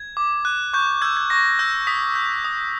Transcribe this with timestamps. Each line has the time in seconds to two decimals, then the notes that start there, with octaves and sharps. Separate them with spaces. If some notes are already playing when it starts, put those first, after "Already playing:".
Already playing: G#6
0.17 D6
0.45 F#6
0.73 C#6 G6
1.02 E6 G6 G#6
1.17 G#6
1.30 C#6 A#6
1.59 E6 G6
1.87 D#6 B6
2.15 G6
2.44 D#6